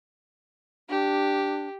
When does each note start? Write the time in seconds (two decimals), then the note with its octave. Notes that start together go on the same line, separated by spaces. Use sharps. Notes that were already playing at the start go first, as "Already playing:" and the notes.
0.89 D4 G4